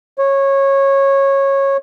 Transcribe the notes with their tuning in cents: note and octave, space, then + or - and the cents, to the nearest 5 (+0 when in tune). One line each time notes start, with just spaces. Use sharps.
C#5 -15